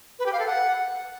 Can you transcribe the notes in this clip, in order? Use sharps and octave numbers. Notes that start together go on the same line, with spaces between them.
B4
G4
F5
A4
F#5